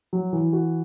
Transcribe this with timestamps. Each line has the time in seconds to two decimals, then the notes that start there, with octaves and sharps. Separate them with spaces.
0.13 F#3
0.33 E3
0.53 F#4